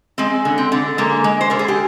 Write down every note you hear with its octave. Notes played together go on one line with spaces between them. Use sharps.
G#3 C4
D3
C4
D3
G#3 A#3
G#3
C5
D3 A#4
G#4
G4